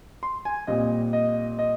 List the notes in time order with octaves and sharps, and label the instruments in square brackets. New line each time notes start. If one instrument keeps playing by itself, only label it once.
[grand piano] C6
G#5
A#2 G3 C4 D#5
D#5
D#5